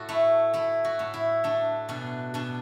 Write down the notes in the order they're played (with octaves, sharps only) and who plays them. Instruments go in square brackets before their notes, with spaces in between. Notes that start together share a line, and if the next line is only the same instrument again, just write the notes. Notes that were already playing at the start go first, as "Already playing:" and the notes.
Already playing: [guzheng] A2 F#4 A4
A3 E4
A3 E4
F#4
A2
E4
A3 D4
B2 D4
B2 D4